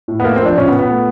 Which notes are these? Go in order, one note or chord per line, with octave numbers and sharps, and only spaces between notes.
A2
B3
A3 A#3
C4
F3 D4
A#2 C#4
B3
A#2
B3
A3